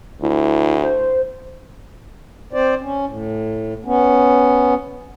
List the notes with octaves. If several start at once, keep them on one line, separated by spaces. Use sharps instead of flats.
D2 E4
C5
C4 C5 D5
C#4
A2
B3 C#4